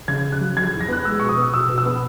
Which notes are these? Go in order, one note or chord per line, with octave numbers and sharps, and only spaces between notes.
C#3 G#6
C#3
F#6
F#3
F#3 G#6
E2
A#6
B3 F#6
G#3 E6
B2 C#6
D#6
B3
B2 E6
B2
E6
B3